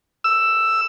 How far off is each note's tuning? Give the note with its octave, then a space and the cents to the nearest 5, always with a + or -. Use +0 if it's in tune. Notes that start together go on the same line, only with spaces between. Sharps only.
E6 +10